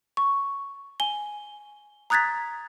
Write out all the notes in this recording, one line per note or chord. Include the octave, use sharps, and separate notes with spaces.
C#6
G#5 G7
A#5 D#6 F#6 G#6 A6 B6